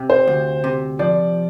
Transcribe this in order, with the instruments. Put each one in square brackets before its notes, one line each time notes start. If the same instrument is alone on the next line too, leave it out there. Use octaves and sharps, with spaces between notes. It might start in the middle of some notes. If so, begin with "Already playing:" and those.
Already playing: [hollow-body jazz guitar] C3
[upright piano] C5
[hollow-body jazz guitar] D2
C3
[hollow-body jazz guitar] F3 [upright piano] D5